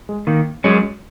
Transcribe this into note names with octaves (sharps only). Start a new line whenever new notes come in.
G#3
D#3 A#3
F#3 G#3 C#4